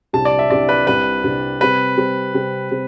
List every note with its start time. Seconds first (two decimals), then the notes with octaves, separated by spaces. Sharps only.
0.13 C2 C3 G3 D4 G4 A5
0.25 D5
0.39 E5
0.50 C2 C3 G3 D4 G4 D5
0.69 B4
0.87 C2 C3 G3 D4 G4 B4
1.24 C2 C3 G3 D4 G4
1.61 C3 G3 C4 B4
1.98 C3 G3 C4
2.34 C3 G3 C4
2.71 C3 G3 C4